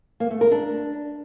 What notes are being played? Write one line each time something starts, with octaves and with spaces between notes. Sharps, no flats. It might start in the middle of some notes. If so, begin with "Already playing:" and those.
A#3
A3
A#4
D4